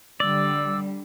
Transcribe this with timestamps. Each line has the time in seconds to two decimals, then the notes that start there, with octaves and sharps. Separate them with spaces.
0.20 D3 G3 D5 E6